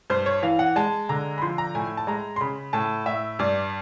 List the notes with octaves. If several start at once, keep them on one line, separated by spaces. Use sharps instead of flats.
G2 C5
C#5
E3 F5
F#5
G#3 A5
D3 A#5
B5
F3 C6
A#5
A2 G#5
A5
G#3 A#5
C6
C#3 B5
A2 A5
A2 E5
G2 D5